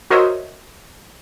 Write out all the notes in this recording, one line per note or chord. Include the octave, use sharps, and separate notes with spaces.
F#4 A#4 C5 C#5 D#5 E5